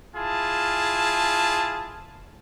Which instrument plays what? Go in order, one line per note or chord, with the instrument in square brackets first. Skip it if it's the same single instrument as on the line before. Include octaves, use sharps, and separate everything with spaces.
[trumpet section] E4 F4 G#4 A5